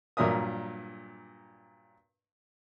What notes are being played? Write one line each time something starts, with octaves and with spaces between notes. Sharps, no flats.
G2 A#2 F#3 A#4 E5 D#6